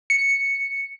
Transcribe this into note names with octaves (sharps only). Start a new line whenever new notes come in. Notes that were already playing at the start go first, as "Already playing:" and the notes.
C#7